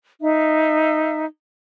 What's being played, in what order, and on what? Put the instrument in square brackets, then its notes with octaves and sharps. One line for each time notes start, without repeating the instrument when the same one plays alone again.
[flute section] D#4 E5